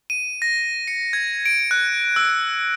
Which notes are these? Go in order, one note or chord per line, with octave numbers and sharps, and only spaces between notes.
D#7
A#6
C#7
G#6
D7
F#6
E6